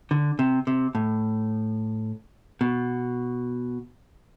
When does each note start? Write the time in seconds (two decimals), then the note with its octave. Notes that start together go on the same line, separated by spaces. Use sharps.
0.11 D3
0.39 C3
0.67 C3
0.95 A2
2.61 B2